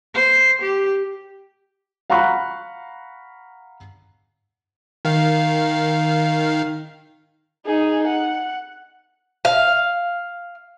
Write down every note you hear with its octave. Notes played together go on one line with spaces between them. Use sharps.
C5
G4
F5 F#5 A#5 B5 C#6 F#6
D#3 F5
D#4 G#4
F#5
F5